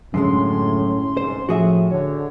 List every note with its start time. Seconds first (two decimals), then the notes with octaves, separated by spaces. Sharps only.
0.14 F#2 A2 D3 G#3 C#4 C6
1.17 C2 G#2 C5
1.49 A2 F3 F#4 G#4 E5
1.91 D3 C#5